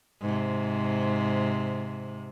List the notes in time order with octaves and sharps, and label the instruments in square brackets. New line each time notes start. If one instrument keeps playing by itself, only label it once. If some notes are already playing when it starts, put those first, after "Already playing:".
[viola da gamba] G#2 C3